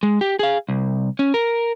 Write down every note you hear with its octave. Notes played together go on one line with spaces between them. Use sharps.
G#3
G4
G#4 F5
C2
C#4
A#4